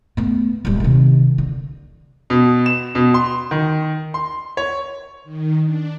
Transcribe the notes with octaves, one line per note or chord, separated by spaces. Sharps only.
A3 B3
D1 G3
C3 D#3
D3
B2
E7
B2
C6
D#3
C6
C#5
D#3
D4